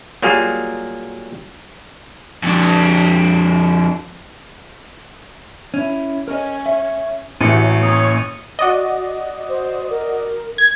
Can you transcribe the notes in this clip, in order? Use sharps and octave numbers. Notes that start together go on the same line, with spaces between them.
F#3 G3 A#3 F4 G#4
F2 D4
C#4 E4
C#4 A#4 D#5
E5
A1 F#3 A3 C4 G4 C#7 D#7
A#3 C#4 C#5 D#6
F#4 D5 D#5
C5
A#4
G#6